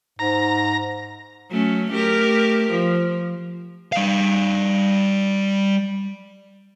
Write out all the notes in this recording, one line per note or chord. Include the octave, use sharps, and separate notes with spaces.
G#2 A#5
F#3 A3 C#4
A3 G4 A#4
F3
G3 F5